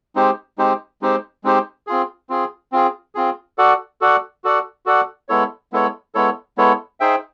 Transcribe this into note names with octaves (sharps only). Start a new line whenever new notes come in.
G#3 C4 D#4 G4 C5
G#3 C4 D#4 G4 C5
G#3 C4 D#4 G4 C5
G#3 C4 D#4 G4 C5
C4 F4 G#4
C4 F4 G#4
C4 F4 G#4
C4 F4 G#4
F#4 A4 D5 F#5
F#4 A4 D5 F#5
F#4 A4 D5 F#5
F#4 A4 D5 F#5
G#3 B3 E4 A4 C#5
G#3 B3 E4 A4 C#5
G#3 B3 E4 A4 C#5
G#3 B3 E4 A4 C#5
D#4 G#4 C5 E5 G5